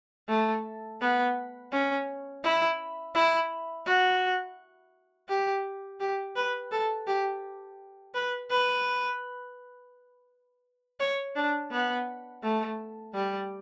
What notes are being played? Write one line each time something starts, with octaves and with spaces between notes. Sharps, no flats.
A3
B3
C#4
E4
E4
F#4
G4
G4
B4
A4
G4
B4
B4
C#5
D4
B3
A3
G3